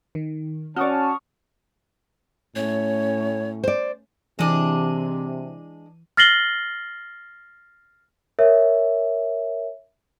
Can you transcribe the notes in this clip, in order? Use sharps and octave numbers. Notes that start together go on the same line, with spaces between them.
D#3
C#4 F#4 D5 A5 C#6 D#6 F6
A2 A3 C#4 C#5
C5 D5
C3 E3 G#3 D4 D#7
F6 A6 A#6 C7 F#7 G7
A#4 C#5 E5